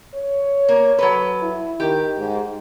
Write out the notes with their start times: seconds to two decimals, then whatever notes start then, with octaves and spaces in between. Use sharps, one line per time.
0.15 C#5
0.68 A#3
0.99 F#3 A4 B4
1.42 E4
1.80 D#3 G4
2.18 G#2